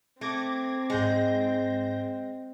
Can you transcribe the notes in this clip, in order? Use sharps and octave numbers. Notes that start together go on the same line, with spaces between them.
A3 C4 D6 G#6 A#6
G#2 G#3 G6 A#6